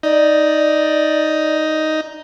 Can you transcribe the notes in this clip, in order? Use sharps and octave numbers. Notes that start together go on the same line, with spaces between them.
D#4 D5